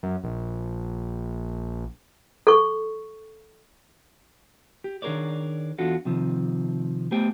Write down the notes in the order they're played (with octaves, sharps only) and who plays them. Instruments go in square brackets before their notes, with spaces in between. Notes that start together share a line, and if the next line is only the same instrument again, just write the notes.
[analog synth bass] F#2
A#1
[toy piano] A4 C#6
[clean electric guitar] G4
D#3 D4 G#4 A#4 C#5 D5
E2 D4 F4 F#4 A4
C3 D#3 F3 C4
A3 B3 G4 C5 G5 G#5